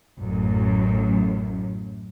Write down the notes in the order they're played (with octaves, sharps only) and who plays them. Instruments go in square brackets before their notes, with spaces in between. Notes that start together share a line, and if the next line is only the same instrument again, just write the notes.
[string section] A1 F#2